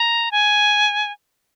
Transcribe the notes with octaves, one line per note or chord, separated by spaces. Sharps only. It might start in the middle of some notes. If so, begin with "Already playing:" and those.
Already playing: A#5
G#5